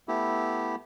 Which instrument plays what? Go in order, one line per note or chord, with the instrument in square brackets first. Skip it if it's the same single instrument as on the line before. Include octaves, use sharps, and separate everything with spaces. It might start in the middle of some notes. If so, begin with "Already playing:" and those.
[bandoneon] A3 B3 E4 G4